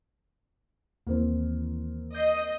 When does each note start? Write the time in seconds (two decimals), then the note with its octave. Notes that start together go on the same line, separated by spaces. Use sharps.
1.07 D#2 E3 A#3 C4
2.14 D#5 G6 C7